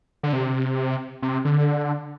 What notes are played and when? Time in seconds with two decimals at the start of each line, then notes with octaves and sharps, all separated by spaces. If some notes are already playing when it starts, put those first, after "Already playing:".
0.23 D3
0.33 C3
1.22 C3
1.45 D3